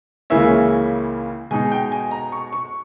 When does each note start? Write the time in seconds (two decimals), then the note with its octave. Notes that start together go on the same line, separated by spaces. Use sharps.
0.30 C#2 C#3 E3 A#3 C#4 E5
1.51 B2 G#3 D#4 G#5
1.72 G5
1.92 G#5
2.11 A#5
2.32 C#6
2.53 C#6